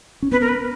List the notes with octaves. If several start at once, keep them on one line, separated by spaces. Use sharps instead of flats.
C#4
B3 B4
A#4
B4